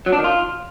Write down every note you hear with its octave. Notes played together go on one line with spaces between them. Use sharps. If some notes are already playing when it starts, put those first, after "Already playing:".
F#3
D4
D#3
F4